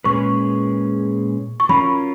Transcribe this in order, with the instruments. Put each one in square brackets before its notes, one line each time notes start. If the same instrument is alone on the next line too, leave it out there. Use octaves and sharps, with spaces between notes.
[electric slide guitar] A#2 G#3 C#4 G#4 B4 [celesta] C#6
[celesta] C#6
[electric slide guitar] F#3 C#4 F4 A#4 [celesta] B5